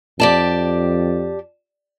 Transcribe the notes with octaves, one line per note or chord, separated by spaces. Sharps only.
F2 G4 D5 A5